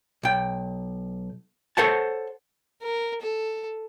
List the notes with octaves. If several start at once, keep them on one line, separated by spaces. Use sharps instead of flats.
B1 G5
A4 C5 C#5 F#5 A5
A#4
A4